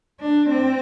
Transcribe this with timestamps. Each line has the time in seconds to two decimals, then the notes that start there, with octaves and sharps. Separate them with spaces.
0.20 D4
0.51 C4